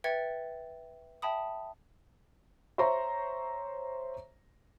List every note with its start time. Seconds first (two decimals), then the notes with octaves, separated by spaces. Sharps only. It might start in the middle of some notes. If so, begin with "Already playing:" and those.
0.04 B4 E5 G5 G#6 A6 C#7
1.22 E5 G5 A5 B5 D#6
2.78 C5 C#5 E5 A#5 C6 C#6